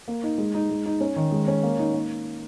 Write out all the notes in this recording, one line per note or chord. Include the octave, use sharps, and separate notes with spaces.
A#3
D#4
G#3
D#4
G#3
D#4
C#4
D#3
G#3
C#4
A#3
D#4
A#3